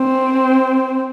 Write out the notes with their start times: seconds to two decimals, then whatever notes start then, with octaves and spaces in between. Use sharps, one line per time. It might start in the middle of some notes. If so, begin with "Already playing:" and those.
Already playing: C4